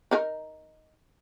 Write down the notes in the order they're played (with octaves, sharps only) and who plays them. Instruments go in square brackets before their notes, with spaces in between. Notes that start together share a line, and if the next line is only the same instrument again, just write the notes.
[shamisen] D#4 A#4